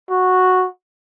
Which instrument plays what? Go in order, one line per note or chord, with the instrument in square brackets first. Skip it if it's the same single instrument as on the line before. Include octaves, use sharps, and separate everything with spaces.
[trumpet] F#4